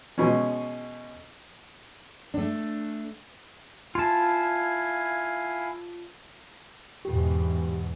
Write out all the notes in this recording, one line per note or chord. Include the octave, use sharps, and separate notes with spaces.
B2 G#3 C#4
A3 D4
E4 F4 F5 G#5 A5
E2 G#2 B2 G4